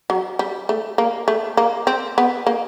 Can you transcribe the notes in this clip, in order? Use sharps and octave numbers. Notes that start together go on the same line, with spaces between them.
F#3
G3
A3
A#3
A3
A#3
C4
B3
A#3